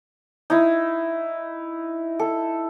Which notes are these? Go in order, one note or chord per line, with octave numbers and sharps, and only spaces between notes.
D#4 E4
A4